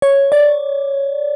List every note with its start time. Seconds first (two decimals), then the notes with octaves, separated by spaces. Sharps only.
0.02 C#5
0.32 D5